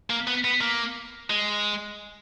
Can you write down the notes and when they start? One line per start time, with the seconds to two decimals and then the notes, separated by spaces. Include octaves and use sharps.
0.10 A#3
0.27 B3
0.44 B3
0.61 A#3
1.30 G#3